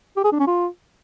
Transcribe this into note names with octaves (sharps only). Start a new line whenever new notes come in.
G4
G#4
D4
C#4
F4